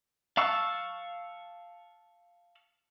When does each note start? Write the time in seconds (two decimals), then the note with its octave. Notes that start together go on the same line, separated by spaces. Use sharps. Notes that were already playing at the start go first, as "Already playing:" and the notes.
0.37 F5 A5 C#6 E6 F#6